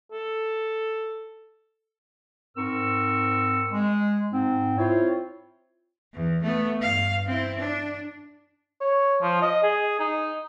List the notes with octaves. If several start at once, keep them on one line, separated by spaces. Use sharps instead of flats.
A4
G#2 C4 A#4 C#6 E6
G#3
G#2 C4
C4 E4 F4 C5 C#5
E2
A3 B3
G2 F5
C4 E4
D4
C#5
F3
D#5
G#4
D#4